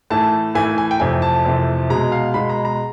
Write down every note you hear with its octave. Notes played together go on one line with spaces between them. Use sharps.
A2 E3 A3 A5
A2 E3 A3 G#5
G#5
G5
F2 C3 E3 A3 G#5
A5
F2 C3 E3 A3
B2 G#3 A#5
F5
B2 G#3 B5
A#5
A#5